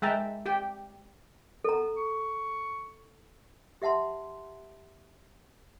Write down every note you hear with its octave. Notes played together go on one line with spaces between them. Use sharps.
G#3 E5 G5 A5 A#5
G4 G5
B3 A4 A#5
C#6
G4 E5 F#5 A5 C6